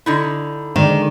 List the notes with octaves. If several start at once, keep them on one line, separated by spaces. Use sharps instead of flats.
D3 D#4 E4
D3 D#3 G#3 D5